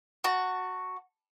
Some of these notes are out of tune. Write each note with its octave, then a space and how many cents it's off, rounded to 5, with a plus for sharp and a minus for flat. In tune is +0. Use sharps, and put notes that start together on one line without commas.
F#4 +0 A5 +35